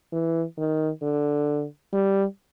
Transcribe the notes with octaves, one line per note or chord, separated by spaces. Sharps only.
E3
D#3
D3
G3